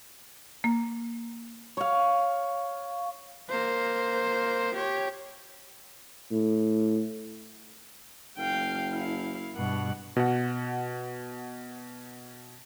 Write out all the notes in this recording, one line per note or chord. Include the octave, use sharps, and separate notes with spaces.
A#3
C#5 F5
A#3 C5
G4 C#5
A2
F#1 F5 G5
E4 F5
G2 B2 F#5
B2 F#5